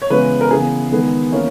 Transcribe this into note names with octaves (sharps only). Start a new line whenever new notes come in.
C#5
C#3 E3 G#3 B3 B4
A#4
C#3 E3 B3 G#4
D#3 G#3 B3
E3 A#3 C#4